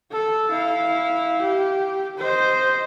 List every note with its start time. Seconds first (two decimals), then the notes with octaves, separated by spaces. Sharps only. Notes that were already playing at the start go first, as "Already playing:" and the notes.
0.11 A4
0.51 E4 F5
1.42 G4
2.19 C5 D#5